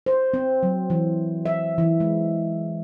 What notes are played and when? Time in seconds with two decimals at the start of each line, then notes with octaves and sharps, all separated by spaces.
0.06 C5
0.34 C4
0.63 F#3
0.90 E3
1.46 E5
1.78 E3
2.00 G#3